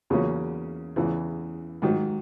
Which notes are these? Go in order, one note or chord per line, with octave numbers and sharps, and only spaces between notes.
E2 C#3 F#3 A#3 C#4
E2 C#3 E3
G#2 D#3 F#3